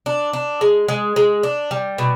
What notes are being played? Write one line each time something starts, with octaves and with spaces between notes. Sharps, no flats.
D4
D4
G#3
G#3
G#3
D4
G3
B2